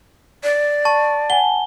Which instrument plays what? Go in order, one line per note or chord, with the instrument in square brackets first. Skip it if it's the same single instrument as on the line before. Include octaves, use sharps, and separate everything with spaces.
[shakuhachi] D5
[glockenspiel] A5 [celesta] C#6
[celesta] F#5 G#5 A5 [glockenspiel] G7